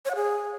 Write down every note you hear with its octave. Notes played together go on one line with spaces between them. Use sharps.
C#5
F#5
G#4